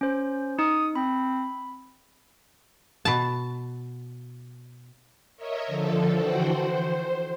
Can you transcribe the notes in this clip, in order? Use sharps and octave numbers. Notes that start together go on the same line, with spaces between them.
C#4 C5
D#4 D#6
C4 B5
B2 A5
A#4 C#5 D#5 E5
D3 F3 A4
E3 F#4 C5 F#5 G5
C5